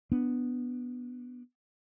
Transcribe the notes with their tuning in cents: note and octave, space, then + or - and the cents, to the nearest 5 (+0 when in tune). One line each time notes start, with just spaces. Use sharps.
B3 +0 D4 +0